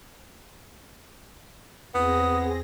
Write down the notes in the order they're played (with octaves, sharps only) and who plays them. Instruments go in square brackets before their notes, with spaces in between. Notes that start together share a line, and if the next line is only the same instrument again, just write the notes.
[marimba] E2 [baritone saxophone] B3 [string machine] C4 G#4 A#6 [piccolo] D#6